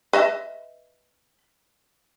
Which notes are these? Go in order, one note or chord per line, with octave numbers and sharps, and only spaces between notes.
B4 D#5 E5